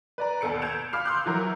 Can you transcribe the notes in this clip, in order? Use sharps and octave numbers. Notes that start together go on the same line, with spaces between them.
B4 D5 A#5
D#2 B2 A4 C#7 D7
G6 G#6 D7 E7 F7
F5 B5 D6 F6 C7 F7
C6 D6 E6 F#6 G6
E3 F#3 A#4